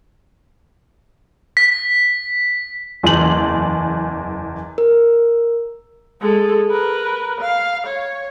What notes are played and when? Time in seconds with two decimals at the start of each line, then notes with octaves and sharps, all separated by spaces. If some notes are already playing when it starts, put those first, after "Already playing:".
1.57 B6
3.03 F#1 E2 F#7
4.78 A#4
6.21 G#3 A4
6.71 A#4 B4
7.41 F5
7.86 C#5